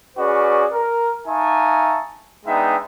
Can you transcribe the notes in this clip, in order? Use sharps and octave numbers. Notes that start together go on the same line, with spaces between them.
C#4 F#4 G#4 B4 D5
A#4
D#4 E5 F5 G#5 A5 C#6
G#3 B3 D4 D#4 E5 G5